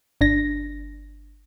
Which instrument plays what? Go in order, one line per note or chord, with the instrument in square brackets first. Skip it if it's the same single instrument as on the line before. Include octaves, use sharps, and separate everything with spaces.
[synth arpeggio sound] G1 D4 A#6